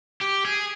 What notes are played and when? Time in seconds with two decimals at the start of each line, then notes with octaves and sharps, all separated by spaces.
0.21 G4
0.45 G#4